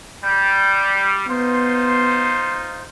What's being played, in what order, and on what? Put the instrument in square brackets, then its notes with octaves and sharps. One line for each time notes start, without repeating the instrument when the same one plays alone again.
[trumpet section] G3 [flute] G6
[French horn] B3 [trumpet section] D#4 F4 C5 [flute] C6